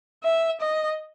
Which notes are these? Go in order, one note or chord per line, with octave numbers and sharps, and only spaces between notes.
E5
D#5